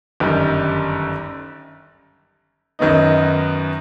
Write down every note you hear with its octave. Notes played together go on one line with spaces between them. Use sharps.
G1 F#2 D#3 G3
F#2 D#3 F#3 B3 D#4